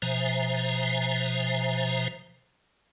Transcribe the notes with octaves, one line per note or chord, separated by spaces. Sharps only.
B2 F3 C5 E5 G#5 A#5